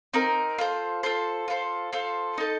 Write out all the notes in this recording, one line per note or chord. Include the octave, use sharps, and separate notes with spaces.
C4 D#4 A#4
F4 A4 C5
F4 A4 C5
F4 A4 C5
F4 A4 C5
D#4 A4 D#5